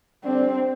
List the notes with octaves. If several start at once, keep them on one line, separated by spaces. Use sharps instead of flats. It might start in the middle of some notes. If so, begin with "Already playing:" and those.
D3 G3 C4 D4